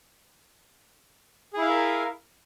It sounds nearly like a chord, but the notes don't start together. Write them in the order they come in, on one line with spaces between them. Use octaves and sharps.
G#4 E4 F5 E5 A#4